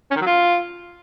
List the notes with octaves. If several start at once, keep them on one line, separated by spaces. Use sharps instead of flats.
C#4
D#3
F#3
F4